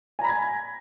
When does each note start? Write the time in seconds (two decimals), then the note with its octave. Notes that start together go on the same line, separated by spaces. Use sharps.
0.19 G#5
0.21 A#5
0.24 B5
0.27 A#6
0.29 G#6